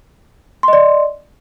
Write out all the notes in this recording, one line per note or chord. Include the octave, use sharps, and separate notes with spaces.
D5 D#5 C6